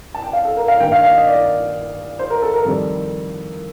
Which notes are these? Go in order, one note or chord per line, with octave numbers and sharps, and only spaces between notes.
A5
G5
F5
A4
A#4
F5
G2 D#3 A#3 G5
F5
F5
D#5
D5
C5
A#4
A4
A#4
F2 D#3 G3 C4 A4